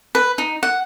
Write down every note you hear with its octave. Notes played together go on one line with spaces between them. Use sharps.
B4
D#4
F#5